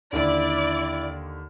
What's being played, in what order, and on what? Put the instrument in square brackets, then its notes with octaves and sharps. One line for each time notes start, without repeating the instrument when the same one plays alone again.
[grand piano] D#2 D3 [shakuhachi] E4 [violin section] D5